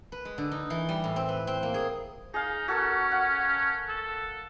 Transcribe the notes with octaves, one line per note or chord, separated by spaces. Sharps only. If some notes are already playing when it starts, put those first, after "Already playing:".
B4
G#3
D3
D#4
E3
G3
A2
C4
B4
C4
A#3
G#4
D#4 G#4 F5
C#4 F#4 A4 A#4
F5 F#5
A4